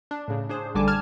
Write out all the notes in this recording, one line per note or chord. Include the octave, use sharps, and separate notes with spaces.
D4
A2 C#3
D4 G#4 C5
A1 D3 G3 G#5 A5 D6
A5 F6 G#6